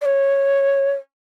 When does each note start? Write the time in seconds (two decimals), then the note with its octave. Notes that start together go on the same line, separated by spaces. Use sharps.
0.01 D5
0.05 C#5